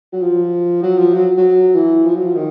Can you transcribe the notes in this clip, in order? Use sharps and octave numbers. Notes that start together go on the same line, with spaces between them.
F#3
F3
F#3
F3
F#3
F#3
E3
F3
F#3
F3
D#3